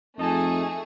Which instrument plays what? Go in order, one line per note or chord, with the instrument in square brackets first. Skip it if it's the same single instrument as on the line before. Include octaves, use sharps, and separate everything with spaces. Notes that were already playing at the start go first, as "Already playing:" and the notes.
[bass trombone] F2 [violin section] A3 G#4 [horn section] D#4 A5